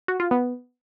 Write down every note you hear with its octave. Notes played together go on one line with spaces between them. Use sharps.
F#4
F4
B3